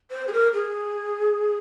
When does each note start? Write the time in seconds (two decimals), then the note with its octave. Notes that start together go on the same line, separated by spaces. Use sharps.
0.11 C5
0.28 G#4
0.33 A#4
0.53 G#4